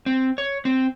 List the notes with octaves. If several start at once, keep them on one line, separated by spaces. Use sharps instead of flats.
C4
C#5
C4